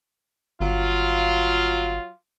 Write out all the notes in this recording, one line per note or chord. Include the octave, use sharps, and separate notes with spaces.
G1 F#3 F4